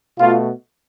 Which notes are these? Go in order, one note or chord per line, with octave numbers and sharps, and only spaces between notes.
B2 A3 F4